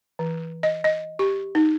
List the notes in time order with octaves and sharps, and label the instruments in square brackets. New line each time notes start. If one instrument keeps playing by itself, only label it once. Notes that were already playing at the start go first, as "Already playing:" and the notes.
[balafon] E3
D#5
D#5
G4
D#4